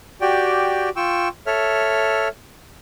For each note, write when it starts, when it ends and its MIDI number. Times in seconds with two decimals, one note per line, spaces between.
0.21 0.89 66
0.21 0.89 67
0.21 0.89 74
0.21 0.89 79
0.96 1.28 65
0.96 1.28 79
0.96 1.28 85
0.96 1.28 88
1.47 2.28 69
1.47 2.28 73
1.47 2.28 76
1.47 2.28 89